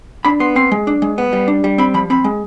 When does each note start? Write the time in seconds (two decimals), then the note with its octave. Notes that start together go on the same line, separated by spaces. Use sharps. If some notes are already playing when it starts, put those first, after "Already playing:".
0.25 D4 B5
0.40 B3 C6
0.56 C4 C6
0.72 G#3
0.87 D4
1.02 G#3
1.18 B3
1.33 G3
1.48 D4
1.64 G3
1.78 C4 B5
1.94 F3 B5
2.10 C4 B5
2.24 G#3